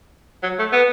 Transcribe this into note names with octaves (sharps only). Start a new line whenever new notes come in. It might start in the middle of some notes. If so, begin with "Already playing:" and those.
F#3
A3
B3